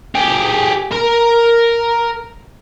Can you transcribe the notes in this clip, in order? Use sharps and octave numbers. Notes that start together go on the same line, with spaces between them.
G4 G#4
A#4 A#5